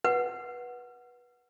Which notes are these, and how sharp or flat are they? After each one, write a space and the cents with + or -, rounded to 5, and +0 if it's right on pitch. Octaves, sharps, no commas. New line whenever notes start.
B4 -20 F#5 +0